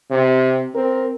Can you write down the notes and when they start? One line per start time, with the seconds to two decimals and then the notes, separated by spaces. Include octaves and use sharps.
0.10 C3
0.75 C4 A#4